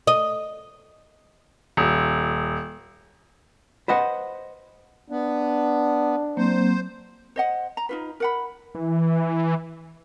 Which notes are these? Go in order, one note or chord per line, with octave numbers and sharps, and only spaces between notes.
D#5
D#1
B4 C5 D#5 F#5
B3 D4
F#3 A#3 C4 C5
C5 D#5 F#5
A#5
D#4 F4 B4
A#4 F#5 B5
E3